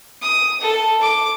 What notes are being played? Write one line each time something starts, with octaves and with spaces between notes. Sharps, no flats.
D#6
A4
D6